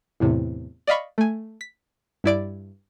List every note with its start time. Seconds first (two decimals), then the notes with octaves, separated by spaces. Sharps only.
0.20 E2 A2 C3
0.87 D5 D#5 F5 B5 C#6
1.18 A3 G#5
1.61 B6
2.24 G2 E4 D5 D7